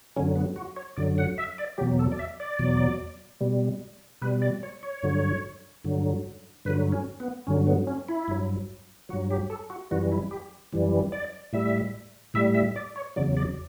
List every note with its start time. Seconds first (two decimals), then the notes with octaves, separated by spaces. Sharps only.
0.16 F#2 D3 F#3 C#4
0.36 B3
0.56 F#4
0.76 C#5
0.97 F#2 D3 F#3 D5
1.18 F#5
1.38 E5
1.58 D5
1.78 E2 B2 F#3 G4
1.99 A4
2.12 D5
2.19 E5
2.40 D5
2.59 E2 B2 F#3
3.41 B2 G3
4.22 B2 G3 B4
4.42 D5
4.63 C#5
4.83 C#5
5.03 G2 D3 F#3
5.84 G2 D3 F#3
6.65 G2 D3 F#3 B4
6.92 C#4
7.20 B3
7.47 G2 D3 F#3 C#4
7.67 B3
7.87 C#4
8.09 E4
8.28 G2 F#3
9.09 F#3 F#4
9.13 G2
9.30 G4
9.50 A4
9.70 F#4
9.91 F#2 E3 G3 F#4
10.12 E4
10.31 G4
10.72 F#2 E3 G3
11.12 D5
11.53 A2 G3 E5
12.34 A2 G3 E5
12.54 E5
12.76 D5
12.96 C#5
13.16 E2 C#3 F#3 D5
13.37 D5